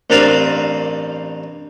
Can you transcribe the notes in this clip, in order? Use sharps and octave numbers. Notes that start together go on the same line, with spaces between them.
A1 G2 A#3 C4 D5 F5